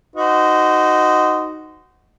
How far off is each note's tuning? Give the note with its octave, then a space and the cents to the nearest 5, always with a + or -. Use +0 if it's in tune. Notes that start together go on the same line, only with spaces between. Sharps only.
D#4 +0 F#4 +0 C5 -25